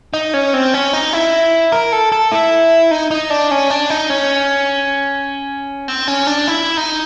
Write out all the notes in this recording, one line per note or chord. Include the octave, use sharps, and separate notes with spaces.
D#4
C#4
C4
C#4
D#4
E4
A#4
A4
A4
E4
D#4
D#4
D4
C#4
D4
D#4
C#4
C4
C#4
D4
E4
D#4